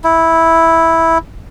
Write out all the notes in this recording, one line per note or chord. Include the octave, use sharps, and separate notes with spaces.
E4